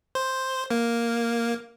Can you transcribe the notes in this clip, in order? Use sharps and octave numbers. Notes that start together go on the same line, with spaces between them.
C5
A#3